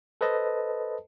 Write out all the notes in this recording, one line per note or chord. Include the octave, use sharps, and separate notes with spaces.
A4 B4 C5 D#5 A5